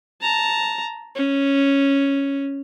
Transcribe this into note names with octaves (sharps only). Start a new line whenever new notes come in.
A5 A#5
C#4